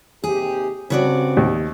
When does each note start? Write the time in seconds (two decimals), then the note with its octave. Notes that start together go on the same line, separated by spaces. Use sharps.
0.24 D#2 C3 G4 G#4
0.90 G2 C#3 C4 F#4 D5
1.37 D#2